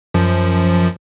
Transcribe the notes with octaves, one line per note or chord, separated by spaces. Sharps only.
F#2 F3